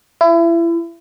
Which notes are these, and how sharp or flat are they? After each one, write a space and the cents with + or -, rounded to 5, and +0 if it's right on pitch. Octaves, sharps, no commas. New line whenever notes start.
E4 +30